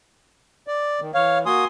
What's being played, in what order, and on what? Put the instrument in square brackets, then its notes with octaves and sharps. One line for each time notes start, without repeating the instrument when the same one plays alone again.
[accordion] D5
D#3
[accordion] E3 [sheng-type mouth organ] C#5 F5
[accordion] A#3 F#4 D#6 [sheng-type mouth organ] G#5 C6